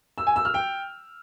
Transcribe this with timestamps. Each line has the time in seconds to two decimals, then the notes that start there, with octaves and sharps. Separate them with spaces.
0.18 E6
0.27 G#5
0.36 E6
0.45 F6
0.54 G5